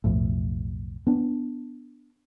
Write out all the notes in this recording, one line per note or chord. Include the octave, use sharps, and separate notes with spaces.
B1 F2 A2
B3 D4